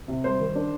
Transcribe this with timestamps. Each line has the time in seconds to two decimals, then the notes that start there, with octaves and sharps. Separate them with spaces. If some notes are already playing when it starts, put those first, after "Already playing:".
0.08 C3
0.24 G3 C5
0.40 D#3
0.55 D4